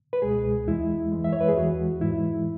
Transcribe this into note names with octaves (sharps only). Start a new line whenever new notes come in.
B4
C#2 B2 G#3 G#4
E2 E3 G#3 E4
F#2 E3 G#3
E5
C#5
B4
G#4
E2 E3 G#3 F#4
G#2 E3 G#3 E4